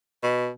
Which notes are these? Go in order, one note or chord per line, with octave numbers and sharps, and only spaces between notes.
B2